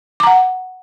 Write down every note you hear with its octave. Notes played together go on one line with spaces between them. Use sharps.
F#5 A#5 D6